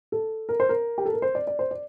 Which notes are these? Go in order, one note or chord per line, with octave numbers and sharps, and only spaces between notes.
A4
A#4
C5
A#4
G4
A4
A#4
C5
D5
D5
C5
D5